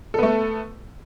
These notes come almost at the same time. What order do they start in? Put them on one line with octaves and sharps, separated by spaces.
A4 B3 A3